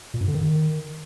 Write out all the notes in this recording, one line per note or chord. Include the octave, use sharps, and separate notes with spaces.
A#2
F#2
D3
D#3